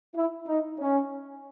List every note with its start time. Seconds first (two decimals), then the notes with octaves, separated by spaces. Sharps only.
0.16 E4
0.48 D#4
0.79 C#4